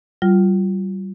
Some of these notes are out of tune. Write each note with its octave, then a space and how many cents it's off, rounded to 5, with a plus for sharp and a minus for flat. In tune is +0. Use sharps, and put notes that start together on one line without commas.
G3 -35 F4 +0